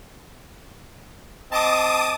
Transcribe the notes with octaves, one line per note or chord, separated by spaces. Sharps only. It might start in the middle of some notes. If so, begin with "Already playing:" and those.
C4 D#5 A5 D6 D#6